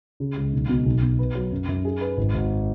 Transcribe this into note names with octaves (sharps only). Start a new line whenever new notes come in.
C#3
C#2
B1
B2
B1
B2
B4
F#3
F#2
F#2
G#4
B4
G#1
G#1